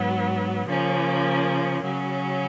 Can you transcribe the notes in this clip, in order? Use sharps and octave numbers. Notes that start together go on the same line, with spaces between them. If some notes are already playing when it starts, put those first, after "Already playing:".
Already playing: G#2 F#3 B3
C#3 F3 A#3 C#4
C#3 F#3 C#4